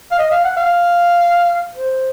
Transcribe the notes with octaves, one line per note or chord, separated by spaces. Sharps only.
F5
D#5
F5
F#5
F5
C5